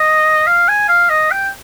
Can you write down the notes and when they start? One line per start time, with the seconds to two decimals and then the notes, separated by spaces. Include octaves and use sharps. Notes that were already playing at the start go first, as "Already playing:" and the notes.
Already playing: D#5
0.47 F5
0.68 G#5
0.89 F5
1.10 D#5
1.31 G5